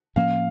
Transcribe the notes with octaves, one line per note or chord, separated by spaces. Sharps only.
A2 F3 A#3 C#4 F5